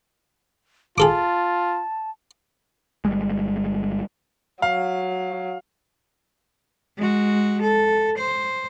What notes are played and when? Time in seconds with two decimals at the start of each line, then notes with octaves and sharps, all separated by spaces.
0.98 F4 G#4 A4 A5 D6
3.05 G1 G3 G#3
4.62 F#3 F5
6.97 G#3 F#4
7.61 A4
8.17 C5